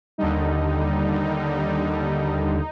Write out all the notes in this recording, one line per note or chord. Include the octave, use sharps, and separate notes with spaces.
D#2 D3 G3 D#4